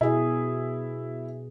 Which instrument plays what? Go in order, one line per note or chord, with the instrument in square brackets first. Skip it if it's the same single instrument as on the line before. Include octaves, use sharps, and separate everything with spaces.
[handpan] B2 G#4 [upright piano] E4